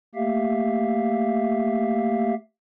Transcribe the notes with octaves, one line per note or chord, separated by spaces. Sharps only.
A3 A#3 G4 E5 F5